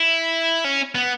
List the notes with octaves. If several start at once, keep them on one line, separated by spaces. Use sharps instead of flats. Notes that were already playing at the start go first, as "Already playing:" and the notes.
Already playing: E4
C#4
B3